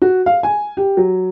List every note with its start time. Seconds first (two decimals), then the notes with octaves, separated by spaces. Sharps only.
0.02 F#4
0.26 F5
0.43 G#5
0.77 G4
0.97 F#3